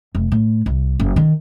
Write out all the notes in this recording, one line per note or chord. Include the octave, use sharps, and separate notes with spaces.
F1
A2
C2
F#1
D#3